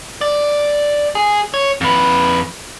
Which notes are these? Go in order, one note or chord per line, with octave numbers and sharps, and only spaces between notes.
D5
G#4
C#5
F2 B4